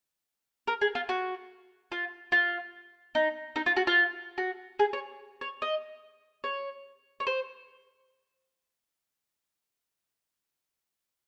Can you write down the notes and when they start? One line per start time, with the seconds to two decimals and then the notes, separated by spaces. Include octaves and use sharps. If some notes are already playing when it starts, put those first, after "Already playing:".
0.67 A#4
0.81 G#4
0.95 F4
1.09 F#4
1.92 F4
2.32 F4
3.15 D#4
3.56 D#4
3.66 F4
3.77 F#4
3.87 F4
4.38 F#4
4.79 G#4
4.93 C#5
5.41 C#5
5.62 D#5
6.44 C#5
7.20 C#5
7.27 C5